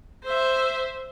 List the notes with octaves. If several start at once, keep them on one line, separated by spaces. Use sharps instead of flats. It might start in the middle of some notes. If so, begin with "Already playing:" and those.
C5 E5